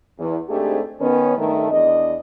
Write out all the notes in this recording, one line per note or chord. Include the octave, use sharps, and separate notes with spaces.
E2
G#2 A3 C4 D4 G4 G#4
D#3 B3 C#4
G2 D#3 A3
E2 D4 D#5